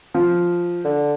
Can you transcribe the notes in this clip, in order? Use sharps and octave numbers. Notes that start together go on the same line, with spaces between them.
F3
D3